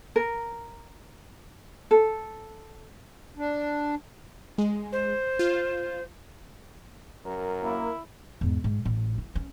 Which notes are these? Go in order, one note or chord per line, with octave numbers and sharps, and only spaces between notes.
A#4
A4
D4
G#3
C5
F4
F#2 A#4
A#3 E4
E2 G#2
G#2
A1
E4
C#4